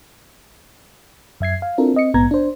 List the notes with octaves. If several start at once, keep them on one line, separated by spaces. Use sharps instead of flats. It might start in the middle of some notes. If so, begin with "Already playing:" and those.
F#2 E5 G#6 C7
F5
C4 D4 E4 F4 A4 A#4
C4 D#5 C#7
A#1 G#2 B3 A#5 G#6
D4 C5